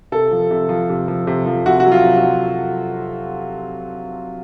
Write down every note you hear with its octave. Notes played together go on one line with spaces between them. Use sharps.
C3 A4
F3
C3
F3
C3
F3
C3
F3
C3 F#4
F#4
F#3
F4
C3
F#4
F#3